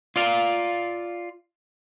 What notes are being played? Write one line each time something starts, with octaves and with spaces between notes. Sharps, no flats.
F4 D5 F5